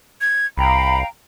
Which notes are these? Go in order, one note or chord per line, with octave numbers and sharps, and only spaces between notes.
G#6
C2 F5 G5 A#5 B5